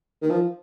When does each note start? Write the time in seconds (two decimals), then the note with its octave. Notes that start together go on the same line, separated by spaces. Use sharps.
0.22 D#3
0.30 F3